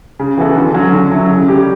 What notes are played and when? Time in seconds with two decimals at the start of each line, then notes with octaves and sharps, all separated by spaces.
0.19 C#3
0.38 E3 B3 F#4 A4
0.56 D3
0.74 F#3 C#4 F#4
0.92 D3
1.11 F#3 C#4 E4 A4
1.30 C#3
1.48 G3 C#4 G4